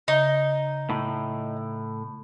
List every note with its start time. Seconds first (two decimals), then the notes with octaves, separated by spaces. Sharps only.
0.08 C#3 D#4
0.90 A2